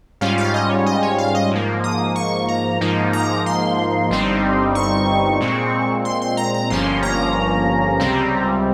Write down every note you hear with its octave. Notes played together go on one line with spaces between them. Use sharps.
G#2 G3 C#4 F4 F5
F5
D#5
C#5
D#5
C#5
F5
D#5
G#2 F3 A#3
D#6
C#6
A#5
G#2 F3 A#3 D#4
A#5
C6
G1 G2 G3 C4 D#4
C#6
A#2 G#3 C4
C6
C6
A#5
A#5
G1 G2 F3 A#3 C#4 C6
A#5
C#2 C3 G3 C4